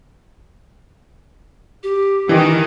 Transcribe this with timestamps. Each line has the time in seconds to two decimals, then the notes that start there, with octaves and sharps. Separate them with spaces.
1.83 G4
2.29 D#3 E3